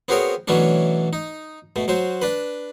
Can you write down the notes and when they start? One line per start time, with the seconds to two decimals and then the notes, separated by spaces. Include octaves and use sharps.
0.08 B3 C4 F#4 G#4 A#4 C#5
0.48 B2 E3 F#3 A3 C#4 D4
1.13 D#4
1.76 B2 A3
1.88 F#3 F#4 C5
2.22 D4 B4